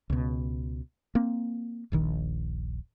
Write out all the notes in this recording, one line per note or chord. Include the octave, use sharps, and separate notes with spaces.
C#2 B2
A#3 C4
D#1 A#1 D#3